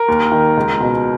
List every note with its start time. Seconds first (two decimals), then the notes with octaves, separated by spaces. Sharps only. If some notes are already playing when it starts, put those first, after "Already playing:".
Already playing: A#4
0.08 D#2
0.32 D#3
0.57 C#2
0.80 B2